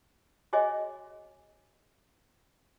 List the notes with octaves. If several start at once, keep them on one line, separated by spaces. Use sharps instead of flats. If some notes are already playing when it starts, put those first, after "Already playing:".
F#4 G#4 C#5 D#5 E5 G#5